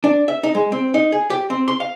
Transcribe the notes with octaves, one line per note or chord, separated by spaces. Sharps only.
D4
E5
D#4
G#3
C4
D#4
G#4
G4
C4
C6
F5